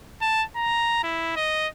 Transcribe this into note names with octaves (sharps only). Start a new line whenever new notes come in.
A5
A#5
E4
D#5